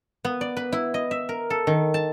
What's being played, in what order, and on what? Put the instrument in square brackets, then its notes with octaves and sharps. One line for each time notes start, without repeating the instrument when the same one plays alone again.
[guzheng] B3
D5
B4
E4
D#5
E5
A#4
A4
D#3
A5